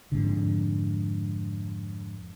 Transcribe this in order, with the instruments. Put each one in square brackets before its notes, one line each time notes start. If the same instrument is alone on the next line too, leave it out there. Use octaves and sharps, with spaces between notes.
[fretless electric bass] F2 G#2 D3